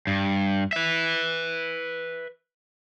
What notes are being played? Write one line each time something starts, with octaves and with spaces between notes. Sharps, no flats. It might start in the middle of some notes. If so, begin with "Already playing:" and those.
G2
B4 E5